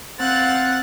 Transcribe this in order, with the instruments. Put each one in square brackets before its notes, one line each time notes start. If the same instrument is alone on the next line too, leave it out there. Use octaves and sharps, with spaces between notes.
[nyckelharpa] C4 F#5 [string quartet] F5 F#6 A6